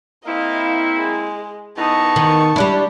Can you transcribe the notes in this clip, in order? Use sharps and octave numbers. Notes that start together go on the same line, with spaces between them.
A#3 C4 E4 D#5 F5
G#3
E3 B3 D#4 A5 C#6
D#3
G3 D4 E4